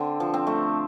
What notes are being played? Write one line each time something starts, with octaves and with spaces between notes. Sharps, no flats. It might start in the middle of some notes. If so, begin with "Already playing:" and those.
Already playing: D3 C4
F3
C4
A3